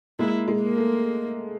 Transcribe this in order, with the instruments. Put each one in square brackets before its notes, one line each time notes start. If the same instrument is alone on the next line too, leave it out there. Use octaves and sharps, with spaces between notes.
[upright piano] G#3 A#3 [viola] E4
[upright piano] G#3
[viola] A#3
[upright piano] A3